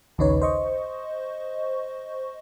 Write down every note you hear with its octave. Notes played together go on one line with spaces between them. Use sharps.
A#1 D#2 C#3 D#4 B4 C#5
C5 D#5 C#6